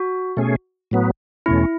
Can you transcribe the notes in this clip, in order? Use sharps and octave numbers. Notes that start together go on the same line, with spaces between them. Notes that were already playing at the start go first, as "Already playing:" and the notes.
Already playing: F#4
B2 A3 C#4 G#4
A2 F#3 B3
E2 B2 A3 C#4 E4